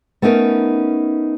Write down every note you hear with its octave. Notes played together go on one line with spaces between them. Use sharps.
A3 B3 C#4 D#4 A#4